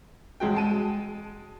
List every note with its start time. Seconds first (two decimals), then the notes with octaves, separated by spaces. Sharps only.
0.40 E1 G#3 F#4 G5
0.55 G#3 A5 D#7